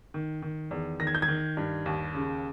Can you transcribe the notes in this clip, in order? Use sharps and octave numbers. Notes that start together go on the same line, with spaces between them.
D#3
D#3
E2
D#3 A#6
G#6
G6
G#6
D#3
G2
D#2
C#3